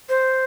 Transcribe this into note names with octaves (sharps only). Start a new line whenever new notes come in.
C5